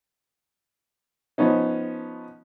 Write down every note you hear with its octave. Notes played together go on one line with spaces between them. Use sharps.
F3 B3 C#4 D#4